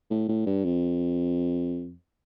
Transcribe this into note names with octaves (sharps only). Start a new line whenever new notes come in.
A2
A2
G2
F2